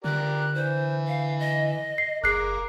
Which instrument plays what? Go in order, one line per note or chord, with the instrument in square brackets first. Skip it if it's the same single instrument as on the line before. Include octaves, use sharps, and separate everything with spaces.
[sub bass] D3 [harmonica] G4 A#4 D5 [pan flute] F#6
[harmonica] E3 [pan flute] C5
[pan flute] F5
D#5
[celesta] C7
[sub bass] F#1 [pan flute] G#4 [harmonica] A#4 D6 [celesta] F#6 C7